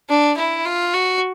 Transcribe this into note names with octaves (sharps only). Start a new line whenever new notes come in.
D4
E4
F4
F#4